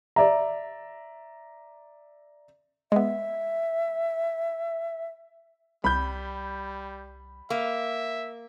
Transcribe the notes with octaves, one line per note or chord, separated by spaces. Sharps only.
D5 E5 A#5
G#3 B3 E5
C2 G3 B5 G6
A#3 E5